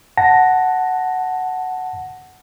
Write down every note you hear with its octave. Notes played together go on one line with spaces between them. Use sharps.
F#5 A5 A#6